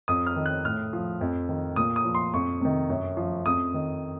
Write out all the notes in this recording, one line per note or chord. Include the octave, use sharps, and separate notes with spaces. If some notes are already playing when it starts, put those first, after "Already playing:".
F2 D#6
F6
D#3
F#6
A2 F6
F3
F2
D#3
A#2 D#6
D#6
F3
C6
F2 C#6
C3 D#3
F#2
F3
F2 D#6
D#3